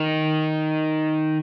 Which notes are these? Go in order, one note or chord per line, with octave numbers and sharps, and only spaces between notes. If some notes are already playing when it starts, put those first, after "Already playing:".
Already playing: D#3